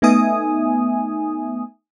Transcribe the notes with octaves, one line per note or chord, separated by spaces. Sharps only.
A3 B3 D#4 E5 G#5 D#6